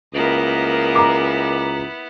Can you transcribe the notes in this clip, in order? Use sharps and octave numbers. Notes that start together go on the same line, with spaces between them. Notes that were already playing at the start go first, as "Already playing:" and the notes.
C#2 A#3 B3 E4 A#4 D#5
A#5 D6